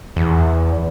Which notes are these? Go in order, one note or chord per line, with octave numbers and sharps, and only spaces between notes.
E2